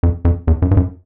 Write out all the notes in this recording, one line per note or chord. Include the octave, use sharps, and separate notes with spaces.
F2
F2
E2
F#2
G2
F#2